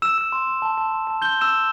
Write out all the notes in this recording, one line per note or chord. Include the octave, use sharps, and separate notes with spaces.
E6 E7
E6
C6
C6
A5
A5
C6
A5
C6 G6 G7
A5 E6 E7
G6